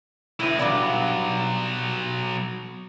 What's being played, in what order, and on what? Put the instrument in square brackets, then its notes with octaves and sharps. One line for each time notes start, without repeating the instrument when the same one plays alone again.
[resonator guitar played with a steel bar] A2 E3 [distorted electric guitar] E4 D#5
[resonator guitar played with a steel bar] G2 B3 D5 [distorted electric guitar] B2 F#3